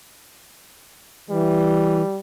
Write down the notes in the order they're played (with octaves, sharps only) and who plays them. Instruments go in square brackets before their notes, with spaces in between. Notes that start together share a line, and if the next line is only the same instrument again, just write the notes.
[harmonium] E3 [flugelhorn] G3